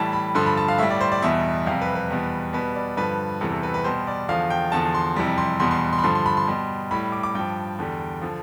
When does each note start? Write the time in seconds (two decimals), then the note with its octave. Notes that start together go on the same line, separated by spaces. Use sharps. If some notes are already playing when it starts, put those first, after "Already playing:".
Already playing: A2 E3 G3 A5
0.13 B5
0.35 G2 D3 F3 C6
0.46 B5
0.57 A5
0.68 F5
0.78 A2 G3 E5
0.90 D5
1.01 C5
1.12 D5
1.22 E2 B2 G3 E5
1.67 F2 C3 G3 F5
1.82 B4
1.95 B4
2.10 E2 B2 G3
2.53 B2 G3 B4
2.75 D5
2.97 G2 D3 F3 B4
3.41 E2 C3 E3 G3 A4
3.52 A4
3.63 B4
3.74 B4
3.84 B2 G3 C5
4.07 D5
4.29 E2 D3 F3 F5
4.50 G5
4.72 E2 D3 F3 A5
4.95 C6
5.16 F2 C3 E3 G3
5.38 C6
5.60 E2 B2 G3 C6
5.71 C6
5.93 C6
5.99 B5
6.04 G2 D3 F3 C6
6.15 C6
6.26 B5
6.37 C6
6.47 B2 G3
6.91 A2 G3 B5
7.12 D6
7.23 D6
7.35 G2 F3 G5
7.79 E2 D3 G3
8.22 D3 F3